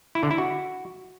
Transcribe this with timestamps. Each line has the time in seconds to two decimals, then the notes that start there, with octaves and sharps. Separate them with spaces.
0.15 E4
0.23 D3
0.31 E4
0.38 F#4